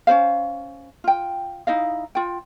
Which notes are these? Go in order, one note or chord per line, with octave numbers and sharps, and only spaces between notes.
C#4 D4 C5 F5
F4 G5
D#4 E4 D#5 F5
F4 G5